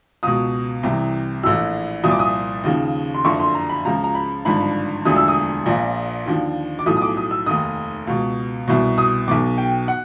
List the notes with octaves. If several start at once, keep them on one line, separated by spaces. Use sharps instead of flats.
C#2 B2 D#6
C2 C3 E3
A#1 A2 E3 E6
C2 A#2 F3 D#6
D6
D#6
D#2 C#3 F3
C6
F#1 F2 D3 F3 C#6
C6
A#5
B5
C#2 C#3 F3 A#5
A#5
B5
G#1 G2 D3 F3 B5
E1 D2 D3 F3 D#6
E6
D#6
A#1 A#2 F3
D#2 D3 F3
D6
B1 A2 F3 D#6
D#6
D6
D#6
E6
F1 D#2 D#3 D#6
C#2 B2
C2 B2
D#6
B1 B2 D6
G5
F#5